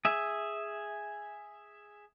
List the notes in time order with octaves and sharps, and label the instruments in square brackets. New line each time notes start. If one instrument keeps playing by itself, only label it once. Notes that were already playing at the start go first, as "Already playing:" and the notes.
[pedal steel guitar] G#4 E5